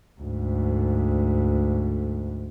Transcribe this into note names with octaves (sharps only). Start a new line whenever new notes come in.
D2 G#2